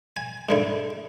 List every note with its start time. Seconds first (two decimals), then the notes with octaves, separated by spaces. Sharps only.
0.17 G#5
0.49 G#2 D3 E4